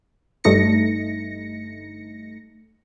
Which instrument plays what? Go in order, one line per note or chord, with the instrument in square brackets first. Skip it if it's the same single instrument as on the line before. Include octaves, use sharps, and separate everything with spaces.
[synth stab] G1 G2 A3 D#4 A#6 C#7